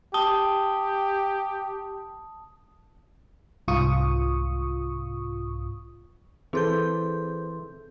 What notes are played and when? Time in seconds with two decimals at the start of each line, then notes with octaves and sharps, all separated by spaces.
0.14 G4 A5 D#6 G7
3.68 C2 G#2 F4 C#6 D#6
6.53 E3 C4 G#4 A4 C5 C6 G6